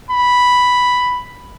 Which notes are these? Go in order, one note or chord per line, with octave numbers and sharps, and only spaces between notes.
B5